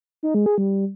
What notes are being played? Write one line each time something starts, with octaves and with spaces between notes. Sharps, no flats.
D#4
G#3
G#4
G3